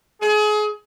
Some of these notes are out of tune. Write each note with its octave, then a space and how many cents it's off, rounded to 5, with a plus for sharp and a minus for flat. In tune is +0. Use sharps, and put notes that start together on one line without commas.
G#4 +30